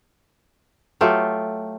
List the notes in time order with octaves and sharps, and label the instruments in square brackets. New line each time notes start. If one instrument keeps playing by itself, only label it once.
[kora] F#3 A3 F4 G4